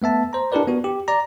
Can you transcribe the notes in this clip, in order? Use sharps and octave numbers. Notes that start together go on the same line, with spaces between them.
A3 B3 E5 A5
C5 A#5
D4 E4 G4 A#4 B4 D5
B3 F#4
G4
D5 A#5